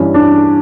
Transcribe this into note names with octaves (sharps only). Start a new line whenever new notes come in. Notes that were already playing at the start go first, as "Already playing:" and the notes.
Already playing: G2 E3 C#4
D4